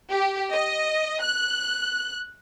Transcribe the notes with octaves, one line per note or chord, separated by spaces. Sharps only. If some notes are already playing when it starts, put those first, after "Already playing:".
G4
D#5
F#6